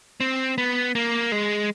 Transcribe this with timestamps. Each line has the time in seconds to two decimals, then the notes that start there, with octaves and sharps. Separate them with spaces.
0.20 C4
0.58 B3
0.95 A#3
1.32 G#3